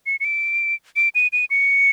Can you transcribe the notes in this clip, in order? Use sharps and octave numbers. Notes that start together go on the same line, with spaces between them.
C#7
C#7
D7
D7
D#7
D#7
C#7